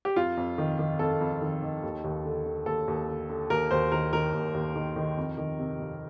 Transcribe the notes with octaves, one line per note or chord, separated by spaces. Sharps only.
G4
F2 F4
F2
D#3
D#3
F2 A4
F2
D#3
D#3
D#2
D#2
D3
D3
D#2 A4
D#2
D3
D3
D#2 A#4
D#2 C5
D#3 A#4
D#3 A#4
D#2
D#2
D#3
D#3
F2
D#3
C3
F2